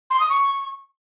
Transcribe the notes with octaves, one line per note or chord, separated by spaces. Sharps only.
C6
D#6
C#6